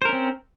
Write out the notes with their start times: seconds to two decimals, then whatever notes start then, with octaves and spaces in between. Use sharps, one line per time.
0.02 C5
0.05 A#4
0.09 C#4
0.13 C4